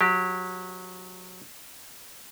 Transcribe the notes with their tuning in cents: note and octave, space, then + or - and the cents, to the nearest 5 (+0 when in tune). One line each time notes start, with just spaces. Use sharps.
F#3 -20 G4 +0